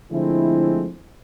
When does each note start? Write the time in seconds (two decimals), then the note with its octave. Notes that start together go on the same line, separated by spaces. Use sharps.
0.12 D3 F3 G#3 A3 C4 E4